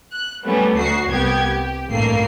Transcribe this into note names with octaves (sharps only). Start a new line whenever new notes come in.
F#6
G3 A3 B3 C#4
D2 F#4 C7
C2 B3 G4 G#6
G4
A1 G2 A3 A#3 C7